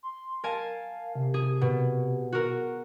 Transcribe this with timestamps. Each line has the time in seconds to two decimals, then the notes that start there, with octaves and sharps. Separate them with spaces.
0.03 C6
0.44 A#4 F5 G#5 A5
1.15 C3
1.34 G#4
1.61 B2
2.32 F#4 A#4